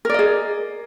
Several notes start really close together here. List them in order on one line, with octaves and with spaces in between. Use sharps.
A#4 D5 D#5 G#4